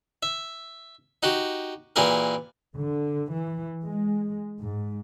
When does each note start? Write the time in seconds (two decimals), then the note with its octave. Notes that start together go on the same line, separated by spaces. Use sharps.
0.23 E5
1.23 D#4 F#4 G4
1.96 A#2 E3 G4 G#4 A#4
2.78 D3
3.32 E3
3.84 G#3
4.61 G#2